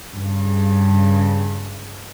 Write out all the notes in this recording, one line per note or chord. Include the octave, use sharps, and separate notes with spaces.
G2 C#3